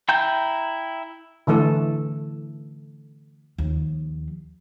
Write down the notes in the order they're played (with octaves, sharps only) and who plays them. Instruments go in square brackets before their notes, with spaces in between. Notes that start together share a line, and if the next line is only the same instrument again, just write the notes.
[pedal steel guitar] E4 G5 A#5 G6
[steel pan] D3 E3 A3 A4
[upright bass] D#2 F3